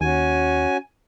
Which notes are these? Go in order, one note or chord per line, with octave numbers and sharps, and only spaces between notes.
D#2 C#4 F#4 G#5